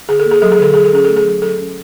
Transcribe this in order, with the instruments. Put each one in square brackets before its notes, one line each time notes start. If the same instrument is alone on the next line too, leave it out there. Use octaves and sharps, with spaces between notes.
[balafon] D3 G#4
A4
A#3
G#4
F#3 A4
G#4
D3 A4
F#3 G#4
A4
C#4 G#4
A3 A4
G#4
F#3
F#3 A4
C#4